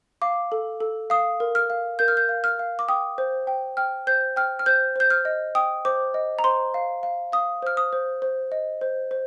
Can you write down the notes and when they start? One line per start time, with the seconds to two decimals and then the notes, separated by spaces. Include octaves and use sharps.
0.22 F5 D6
0.52 A4
0.80 A4
1.10 F5 D#6
1.40 A#4
1.55 F6
1.70 F5
1.99 A#4 G6
2.08 F6
2.17 G6
2.29 F5
2.44 F6
2.59 F5
2.79 D6
2.89 G5 D#6
3.18 C5
3.47 G5
3.77 G5 F6
4.07 C5 G6
4.36 G5 F6
4.59 F6
4.66 C5 G6
4.96 C5 G6
5.10 F6
5.25 D#5
5.55 G5 D#6
5.85 C5 D6
6.14 D#5
6.39 A#5
6.44 C5 C6
6.74 F5
7.03 F5
7.32 F5 D#6
7.62 C5 F6
7.77 D#6
7.93 C5
8.22 C5
8.52 D#5
8.81 C5
9.11 C5